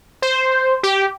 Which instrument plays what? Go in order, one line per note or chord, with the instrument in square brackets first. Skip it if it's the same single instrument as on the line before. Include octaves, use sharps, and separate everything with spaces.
[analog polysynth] C5
G4